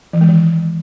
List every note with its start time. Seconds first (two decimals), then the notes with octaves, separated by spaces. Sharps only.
0.13 E3
0.21 G#3
0.29 D#3